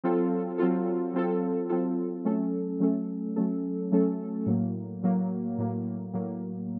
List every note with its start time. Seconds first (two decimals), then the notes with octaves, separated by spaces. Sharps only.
0.04 F#3 C4 F4 A4
0.58 F#3 C4 F4 A4
1.13 F#3 C4 F4 A4
1.70 F#3 C4 F4 A4
2.25 F#3 A3 C#4 A4
2.80 F#3 A3 C#4 A4
3.36 F#3 A3 C#4 A4
3.92 F#3 A3 C#4 A4
4.46 A2 F#3 A#3
5.03 A2 F#3 A#3
5.58 A2 F#3 A#3
6.14 A2 F#3 A#3